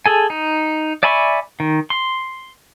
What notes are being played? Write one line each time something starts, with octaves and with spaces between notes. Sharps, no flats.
G#4 A4 G#5
D#4
D5 E5 G#5 B5 C#6
D#3
C6